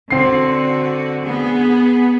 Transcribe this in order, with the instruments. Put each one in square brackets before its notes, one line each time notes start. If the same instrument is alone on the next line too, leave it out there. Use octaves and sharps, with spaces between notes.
[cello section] D3 F#4 [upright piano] C4 C7
[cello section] B3 G#4